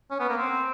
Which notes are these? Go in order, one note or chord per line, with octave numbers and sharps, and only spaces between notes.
C#4
B3
A#3
C4